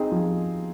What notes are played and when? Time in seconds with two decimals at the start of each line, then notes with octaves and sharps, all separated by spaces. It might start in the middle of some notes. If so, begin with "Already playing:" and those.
Already playing: C4 D#4 G#4
0.12 F3